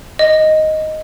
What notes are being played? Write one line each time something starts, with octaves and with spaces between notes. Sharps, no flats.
D#5